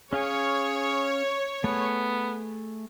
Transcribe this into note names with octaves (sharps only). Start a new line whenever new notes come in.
C#4 G#4 C#5 F5 G#5
A3 B3 G#4